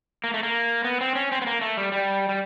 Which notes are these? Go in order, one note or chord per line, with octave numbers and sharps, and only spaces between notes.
A#3
A3
A#3
B3
C4
C#4
C4
B3
A#3
A3
G3
G3
G3